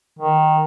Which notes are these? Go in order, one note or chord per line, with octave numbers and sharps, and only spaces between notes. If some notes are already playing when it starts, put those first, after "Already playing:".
D#3